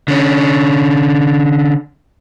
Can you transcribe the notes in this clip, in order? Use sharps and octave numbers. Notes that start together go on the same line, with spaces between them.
D3 C#4